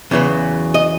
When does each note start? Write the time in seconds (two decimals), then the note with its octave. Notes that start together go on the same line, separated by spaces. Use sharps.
0.11 E2 C#3 F#3 B3
0.74 D#5